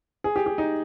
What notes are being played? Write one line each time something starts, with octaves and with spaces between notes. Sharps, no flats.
G#4
G4
G4
D#4